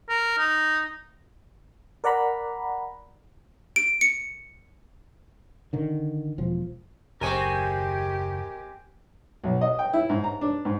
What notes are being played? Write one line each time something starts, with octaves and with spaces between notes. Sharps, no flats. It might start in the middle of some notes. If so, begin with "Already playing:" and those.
A#4
D#4
A#4 D5 F#5 A#5 B5
D7
C#7
D3 D#3
E1 F3
F#1 D#2 G#3 C4 G4 A#4 G#5 C#6
B1
D#5
G5
E4
G#2
A#5
D4
G#2